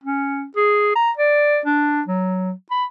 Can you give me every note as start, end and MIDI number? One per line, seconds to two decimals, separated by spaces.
0.04 0.45 61
0.56 0.91 68
0.96 1.11 82
1.17 1.60 74
1.66 2.02 62
2.08 2.52 54
2.71 2.85 83